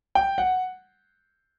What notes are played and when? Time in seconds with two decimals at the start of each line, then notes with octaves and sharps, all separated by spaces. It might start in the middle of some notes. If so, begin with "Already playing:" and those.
0.15 G5
0.38 F#5